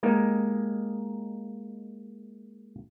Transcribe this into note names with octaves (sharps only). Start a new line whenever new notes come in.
G#3 A#3 D#4 G4